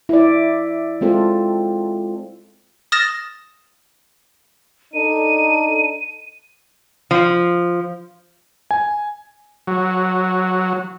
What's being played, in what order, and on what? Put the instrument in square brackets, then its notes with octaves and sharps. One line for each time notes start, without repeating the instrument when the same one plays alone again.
[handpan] E4 D5
G#3 C4 F4 A4
[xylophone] D#6 F6 A6 A#6 E7
[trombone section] D4 D#4 A4 [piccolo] D#7
[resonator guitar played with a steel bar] F3
[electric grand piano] G#5
[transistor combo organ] F#3